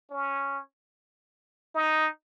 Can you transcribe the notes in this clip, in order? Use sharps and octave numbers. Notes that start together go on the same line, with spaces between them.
C#4
D#4